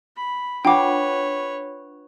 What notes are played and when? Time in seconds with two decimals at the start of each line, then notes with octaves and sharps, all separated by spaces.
0.17 B5
0.65 D4 F4 B4 C#5 F#5 G5 D6